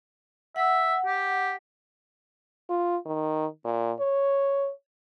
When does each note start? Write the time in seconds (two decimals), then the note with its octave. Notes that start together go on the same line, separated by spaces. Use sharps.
0.56 E5 F#5
1.06 G4
2.70 F4
3.06 D#3
3.65 A#2
3.99 C#5